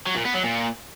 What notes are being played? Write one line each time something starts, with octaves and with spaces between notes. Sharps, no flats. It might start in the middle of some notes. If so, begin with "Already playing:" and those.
F#3
A#2
B3
F#3
A#2